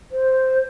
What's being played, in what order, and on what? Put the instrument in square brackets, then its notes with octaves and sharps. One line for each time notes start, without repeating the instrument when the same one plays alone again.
[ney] C5